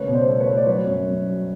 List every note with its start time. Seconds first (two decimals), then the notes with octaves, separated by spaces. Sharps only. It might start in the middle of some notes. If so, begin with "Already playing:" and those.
Already playing: C#3 A3 B4 C#5
0.08 B2
0.14 C5 D5
0.27 A3
0.40 B4 C#5
0.46 A3
0.57 D5
0.66 F#3 B4 C#5
0.86 F#2
1.06 F#2
1.25 F#3